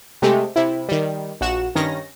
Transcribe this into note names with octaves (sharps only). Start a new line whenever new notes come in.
C3 G#3 A3 G4
C3 E4
D#3 G3
A#1 F#4 E7
G2 D#3 C#4 A#6